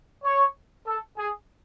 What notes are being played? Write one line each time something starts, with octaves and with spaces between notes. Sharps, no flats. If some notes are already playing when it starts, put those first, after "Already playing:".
C#5
A4
G#4